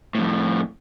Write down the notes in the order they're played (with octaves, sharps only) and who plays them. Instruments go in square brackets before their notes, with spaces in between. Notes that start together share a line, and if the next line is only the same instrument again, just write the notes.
[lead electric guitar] F2 A2